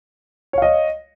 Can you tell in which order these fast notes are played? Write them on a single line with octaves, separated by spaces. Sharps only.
C#5 F5 D#5